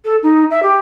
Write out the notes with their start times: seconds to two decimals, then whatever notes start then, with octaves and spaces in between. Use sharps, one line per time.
0.05 A4
0.23 D#4
0.51 E5
0.63 G4